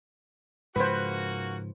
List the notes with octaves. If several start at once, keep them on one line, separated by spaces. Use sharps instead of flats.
G#2 C#3 F3 A#3 F#4 B4 C5